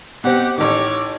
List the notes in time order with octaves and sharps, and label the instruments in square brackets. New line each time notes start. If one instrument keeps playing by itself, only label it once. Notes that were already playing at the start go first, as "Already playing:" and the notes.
[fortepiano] B2 C4 [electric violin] G4 F#5
[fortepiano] A1 D#3 [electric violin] C#5 D6